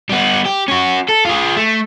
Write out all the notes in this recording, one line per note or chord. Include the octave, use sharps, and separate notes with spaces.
G3 B3
G4
C#4 F#4
A4
F4 G#4
A3